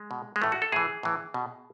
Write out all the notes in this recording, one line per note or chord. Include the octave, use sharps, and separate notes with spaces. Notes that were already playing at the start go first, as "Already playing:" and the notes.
Already playing: G#3
B2
G#3
A2 E3 A3
F#4
A4
A2 E3 G#4
A2 E3
B2